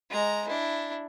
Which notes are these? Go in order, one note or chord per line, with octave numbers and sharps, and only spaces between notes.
G#3 A#5
D4 E4